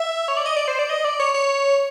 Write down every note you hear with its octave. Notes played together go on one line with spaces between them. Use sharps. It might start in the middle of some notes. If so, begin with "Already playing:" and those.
Already playing: E5
C#5
D5
D#5
D5
C5
D5
D#5
D5
C#5
C#5